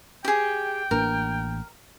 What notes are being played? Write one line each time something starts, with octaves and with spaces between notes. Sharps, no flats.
G4 G#4 G5
A1 A#3 D4 A#4